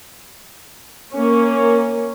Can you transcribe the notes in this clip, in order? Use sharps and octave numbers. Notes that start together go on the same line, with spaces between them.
A#3 C#4